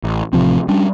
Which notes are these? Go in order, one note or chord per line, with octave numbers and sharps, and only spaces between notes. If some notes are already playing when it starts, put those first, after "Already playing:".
A1
A1 C3 F3 C4
G3 C#4 D4